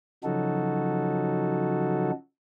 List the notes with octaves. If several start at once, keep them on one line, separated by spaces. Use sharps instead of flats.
C#3 F3 F#3 D#4 F#4 A4